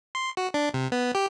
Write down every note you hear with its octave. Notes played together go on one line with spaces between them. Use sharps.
C6
F#4
D4
C3
B3
G4